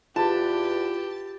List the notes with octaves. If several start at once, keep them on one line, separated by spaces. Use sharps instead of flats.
E2 F4 G4 A5